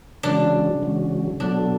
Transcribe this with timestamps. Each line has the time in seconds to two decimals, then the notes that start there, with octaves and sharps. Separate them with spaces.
0.23 C#3 E3 G#3 C#4 D4 F#4
0.82 C#3 E3 G#3 C#4 F#4
1.39 B2 F#3 B3 D4 F#4 A4